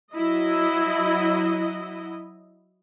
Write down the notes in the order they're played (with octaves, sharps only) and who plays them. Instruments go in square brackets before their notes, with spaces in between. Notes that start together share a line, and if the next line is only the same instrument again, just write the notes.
[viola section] F#3 E4 D#5